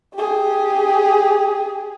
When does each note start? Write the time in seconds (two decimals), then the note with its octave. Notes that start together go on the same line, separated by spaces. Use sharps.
0.14 G4 G#4